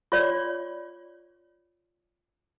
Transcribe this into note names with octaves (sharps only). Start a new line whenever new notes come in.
F4 C#5 D5